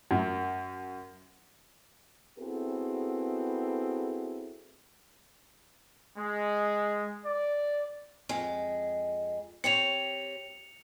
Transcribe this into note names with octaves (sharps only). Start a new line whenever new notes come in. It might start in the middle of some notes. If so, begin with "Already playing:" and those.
F#2
B3 C4 E4 F#4 G#4 A4
G#3
D5
F2 G#3
C4 G4 C#5 C#7 F7